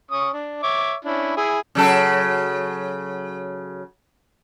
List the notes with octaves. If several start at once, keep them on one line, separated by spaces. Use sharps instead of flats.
C#4 C#6 D#6
D4
C#5 E5 D6
C#4 D4 E4
E4 G#4
C#3 F#3 A4